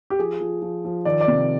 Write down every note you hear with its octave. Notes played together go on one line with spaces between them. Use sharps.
G4
F3 G#4
F3
F3
F3
D#3 D5
D5
C3